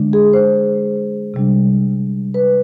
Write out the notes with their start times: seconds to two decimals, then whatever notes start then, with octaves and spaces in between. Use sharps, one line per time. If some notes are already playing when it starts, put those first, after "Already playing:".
Already playing: D3 G#3 D4
0.13 G#4
0.33 C5
1.34 C3 G3 D4
2.34 B4